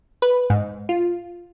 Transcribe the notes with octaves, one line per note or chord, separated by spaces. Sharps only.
B4
G#2
F4